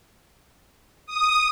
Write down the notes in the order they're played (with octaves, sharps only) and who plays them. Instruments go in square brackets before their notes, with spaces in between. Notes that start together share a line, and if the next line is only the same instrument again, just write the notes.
[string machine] D#6